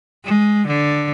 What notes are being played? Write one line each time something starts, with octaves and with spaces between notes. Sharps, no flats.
G#3
D3